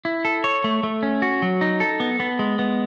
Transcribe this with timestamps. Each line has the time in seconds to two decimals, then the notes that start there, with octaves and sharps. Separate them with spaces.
0.05 E4
0.25 A4
0.44 C#5
0.64 A3
0.83 A3
1.03 C#4
1.22 F#4
1.42 F#3
1.61 D#4
1.80 A4
2.00 B3
2.20 B3
2.39 G#3
2.59 B3